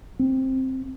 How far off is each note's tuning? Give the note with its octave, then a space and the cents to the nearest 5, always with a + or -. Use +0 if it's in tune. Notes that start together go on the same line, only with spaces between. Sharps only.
C4 +5